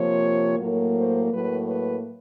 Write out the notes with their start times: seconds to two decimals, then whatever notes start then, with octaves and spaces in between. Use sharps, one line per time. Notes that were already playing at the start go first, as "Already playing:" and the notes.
Already playing: C3 F3 A#3 C#5
0.58 A2 F#3 A#3
0.96 C5
1.32 A2 F#3 A#3 B4
1.69 B4